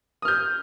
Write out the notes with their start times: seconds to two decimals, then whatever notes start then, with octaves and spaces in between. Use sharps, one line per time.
0.22 D#6
0.25 F6
0.28 G6